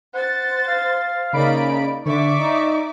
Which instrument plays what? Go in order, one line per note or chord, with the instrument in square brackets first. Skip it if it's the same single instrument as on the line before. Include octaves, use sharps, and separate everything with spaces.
[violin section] C5 A6 [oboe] F#5
[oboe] F5
[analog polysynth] C#3 B5 D7 [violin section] A#3 D#4 D5
[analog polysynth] D3 [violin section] D5 E5 D6 [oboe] C#6
[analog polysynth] D#4